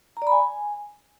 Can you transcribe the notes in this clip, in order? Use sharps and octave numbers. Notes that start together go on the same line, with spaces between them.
A#5
D5
B5
G#5